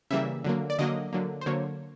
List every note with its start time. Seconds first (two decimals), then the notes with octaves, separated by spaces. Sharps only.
0.11 C#3 E3 G3 A#3 E5
0.44 D3 F#3 A#3
0.70 D5
0.79 D3 F#3 A#3 D#5
1.13 D3 F#3 A#3
1.41 C5
1.46 D3 F#3 A#3 C#5